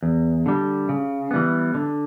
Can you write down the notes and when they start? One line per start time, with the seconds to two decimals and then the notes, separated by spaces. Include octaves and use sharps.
0.03 E2
0.46 D3 G3
0.89 C#3
1.31 E3 G3 B3
1.74 D3